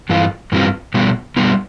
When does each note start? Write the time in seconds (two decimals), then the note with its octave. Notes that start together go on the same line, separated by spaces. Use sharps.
0.09 G2 E3 F4
0.52 G2 E3 G3 C4 F4
0.94 B2 G3 B3 F4
1.36 B2 G3 B3 F4